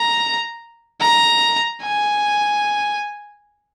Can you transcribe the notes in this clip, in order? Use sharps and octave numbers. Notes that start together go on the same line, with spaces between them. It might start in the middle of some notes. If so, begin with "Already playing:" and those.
Already playing: A#5
A#5
G#5